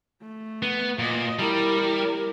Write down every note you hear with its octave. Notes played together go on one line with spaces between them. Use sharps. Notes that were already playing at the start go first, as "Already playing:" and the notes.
A3
B3
A#2 D#5
G3 E4 A#4